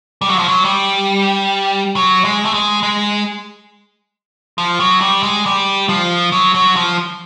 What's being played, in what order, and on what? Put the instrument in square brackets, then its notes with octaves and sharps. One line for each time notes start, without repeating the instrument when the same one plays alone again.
[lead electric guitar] G3
F#3
F3
F#3
G3
F#3
G#3
A3
G#3
G#3
F3
F#3
G3
G#3
G3
F3
F#3
F#3
F3